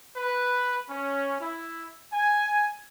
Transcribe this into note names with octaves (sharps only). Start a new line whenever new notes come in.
B4
C#4
E4
G#5